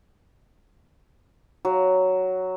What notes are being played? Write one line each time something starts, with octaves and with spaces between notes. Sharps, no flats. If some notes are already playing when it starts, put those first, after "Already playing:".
F#3